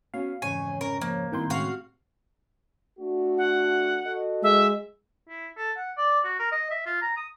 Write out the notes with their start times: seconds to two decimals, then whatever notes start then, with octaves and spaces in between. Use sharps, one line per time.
0.14 B3 C#4 F#4 F5
0.42 F2 G#2 C#3 E3 C#5 G#5
0.81 C#4 A#4
1.01 F3 A#3
1.32 G2 D#3 B3 C4 E4 G5 C6
1.50 A2 C#3 G#3 F#4 F5
2.99 A3 D4 F#4
3.38 F#5
4.06 F#4 A4 D#5
4.43 G#3 E5
5.29 E4
5.57 A4
5.77 F#5
5.97 D5
6.24 F#4
6.39 A#4
6.51 D#5
6.71 E5
6.86 F4
7.01 A#5
7.17 D#6